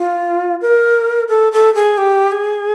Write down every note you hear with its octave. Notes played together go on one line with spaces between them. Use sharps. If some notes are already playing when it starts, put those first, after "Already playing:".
Already playing: F4
A#4
A4
A4
G#4
G4
G#4